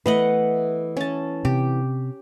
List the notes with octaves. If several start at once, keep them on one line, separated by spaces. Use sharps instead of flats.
E3 A3 B3 B4 D#5 F#5
C#4 A5
C3 G4